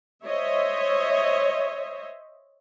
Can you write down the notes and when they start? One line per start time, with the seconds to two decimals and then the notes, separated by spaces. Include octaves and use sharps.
0.25 C5 C#5 D#5 E5